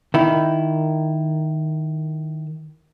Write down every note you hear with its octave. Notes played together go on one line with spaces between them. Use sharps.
D#3 E4